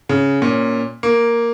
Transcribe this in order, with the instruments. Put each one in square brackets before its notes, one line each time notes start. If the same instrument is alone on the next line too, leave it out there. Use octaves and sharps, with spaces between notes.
[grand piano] C#3
A#2 C#4
A#3